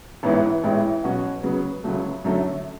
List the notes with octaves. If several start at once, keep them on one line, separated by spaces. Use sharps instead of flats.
A1 G#2 E3 B3 E4
A1 A2 G#3 B3 E4
B2 F#3 C#4 F#4
C#3 F#3 B3
C#2 C#3 F#3 A3
F#2 D3 F#3 A3